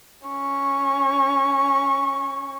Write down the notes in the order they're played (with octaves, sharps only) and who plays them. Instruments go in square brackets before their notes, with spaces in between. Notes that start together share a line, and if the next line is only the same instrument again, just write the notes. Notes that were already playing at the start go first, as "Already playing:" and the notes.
[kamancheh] C#4 C#6